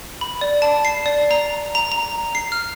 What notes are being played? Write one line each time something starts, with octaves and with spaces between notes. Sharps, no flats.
B5
D5
A5
C7
D5
A#5
A#5
A#5
C7
F6